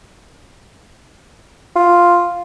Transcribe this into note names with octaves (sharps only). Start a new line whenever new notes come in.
F4